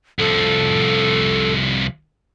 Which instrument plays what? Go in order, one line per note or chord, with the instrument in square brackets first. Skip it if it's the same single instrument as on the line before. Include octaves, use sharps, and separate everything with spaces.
[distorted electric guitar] C2 F3 [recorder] A4